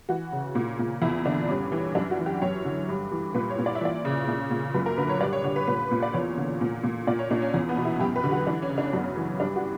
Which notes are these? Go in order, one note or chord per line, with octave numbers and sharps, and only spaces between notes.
E3 F#4
C#3
A#2
A#2
E2 E4
D3 D4
G2 C#4
E3
F#2 D4
F#4
E3
G4
F#2 C#5
D3
G2
E3
A#2 B4
C#5
A#2
D5
E5
E3 D5
C#3
A#2
A#2
F#2 B4
A#4
D3 B4
C#5
G2 D5
C#5
D3 C#5
B4
A#2 B4
A#2
D5
E2 C#5
D3
A#2
A#2
A#2 D5
C#5
A#2 D4
C#4
E2
B3
B2
E4
F#2 G4
B4
D3
F#4
E3 D4
C#4
C#3
D4
C#4
F#2 B3
C#4
E3
G2 D4
F#4